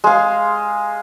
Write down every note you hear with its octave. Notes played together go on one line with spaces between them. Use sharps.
G#3 F5